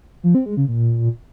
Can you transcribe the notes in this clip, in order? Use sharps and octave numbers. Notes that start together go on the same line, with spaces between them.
F3
C4
G#3
C#3
A#2